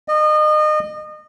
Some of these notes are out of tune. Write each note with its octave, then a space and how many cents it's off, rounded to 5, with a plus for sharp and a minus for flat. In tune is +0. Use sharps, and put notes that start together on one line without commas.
D#5 -30